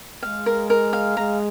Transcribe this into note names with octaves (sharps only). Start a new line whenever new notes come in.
G#3 F5
A#4
A#4
F5
G#3 A#5